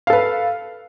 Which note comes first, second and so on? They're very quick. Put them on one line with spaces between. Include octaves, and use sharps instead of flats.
F5 A4 B4